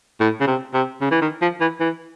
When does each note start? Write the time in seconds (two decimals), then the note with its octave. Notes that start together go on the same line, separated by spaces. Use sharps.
0.20 A2
0.41 C#3
0.47 C3
0.74 C3
1.01 C#3
1.11 E3
1.22 D#3
1.42 F3
1.60 E3
1.80 E3